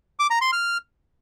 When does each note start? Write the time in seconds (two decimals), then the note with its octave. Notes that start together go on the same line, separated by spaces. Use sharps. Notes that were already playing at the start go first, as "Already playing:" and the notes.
0.19 D6
0.30 A#5
0.41 C6
0.53 F6